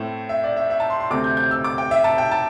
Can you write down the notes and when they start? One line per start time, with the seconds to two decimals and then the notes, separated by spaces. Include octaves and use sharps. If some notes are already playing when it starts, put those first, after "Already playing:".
Already playing: A2 A3 C4
0.29 E5
0.44 D5
0.56 E5
0.70 E5
0.80 A5
0.90 C6
1.00 C6
1.10 D2 C3 A3 C4 D6
1.24 G6
1.37 G6
1.51 E6
1.64 D6
1.78 G5
1.91 E5
2.04 A5
2.18 G5
2.31 A5